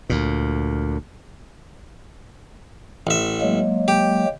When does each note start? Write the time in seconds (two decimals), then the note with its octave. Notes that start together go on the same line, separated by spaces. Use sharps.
0.10 D2 A#2
3.07 A1 E5
3.41 F#3 G#3 A#3
3.88 G4